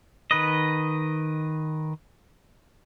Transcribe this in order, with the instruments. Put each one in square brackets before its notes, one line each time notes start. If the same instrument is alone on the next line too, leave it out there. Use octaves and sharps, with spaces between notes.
[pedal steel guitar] D#3 B4 D#5